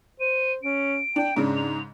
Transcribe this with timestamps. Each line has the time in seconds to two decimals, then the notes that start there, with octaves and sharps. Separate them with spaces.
0.20 C5 D#7
0.63 C#4 D7
1.16 D4 G5
1.36 G#2 C#3 D4
1.56 F7